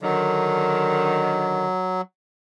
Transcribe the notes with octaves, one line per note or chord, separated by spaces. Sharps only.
D3 D#3 F#3